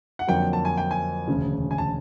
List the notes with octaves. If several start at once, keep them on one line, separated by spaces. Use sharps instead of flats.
F#5
F2 D3 F#3 A#3 G5
A5
G#5
G5
G#5
E1 D2 C#3
G#5
A5